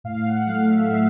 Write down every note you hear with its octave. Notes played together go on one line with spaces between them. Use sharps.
A2 F5
F#5
F#3 A3 F5
E5
A2 F5